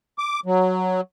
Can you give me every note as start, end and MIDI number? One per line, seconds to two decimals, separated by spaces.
0.18 0.40 86
0.46 1.01 54